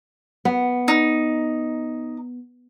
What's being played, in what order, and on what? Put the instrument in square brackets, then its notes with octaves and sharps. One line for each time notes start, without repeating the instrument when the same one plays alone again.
[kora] B3
[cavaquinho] D#4